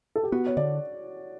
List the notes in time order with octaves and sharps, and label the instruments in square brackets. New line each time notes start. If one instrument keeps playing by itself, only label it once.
[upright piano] A4
G4
[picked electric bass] B3 [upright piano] F#4
[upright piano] C#5
[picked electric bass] D3 [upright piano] D5